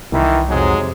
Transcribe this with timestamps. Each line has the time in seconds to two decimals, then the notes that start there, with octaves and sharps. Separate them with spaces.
0.12 C2 D#3 E3
0.48 F2 G#2 C3 F#3 G#3